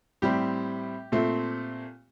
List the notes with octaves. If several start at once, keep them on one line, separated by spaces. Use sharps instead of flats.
A2 G3 C4 G4
A#2 A3 C4